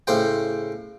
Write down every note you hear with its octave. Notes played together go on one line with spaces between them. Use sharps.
A2 C#3 C5 G5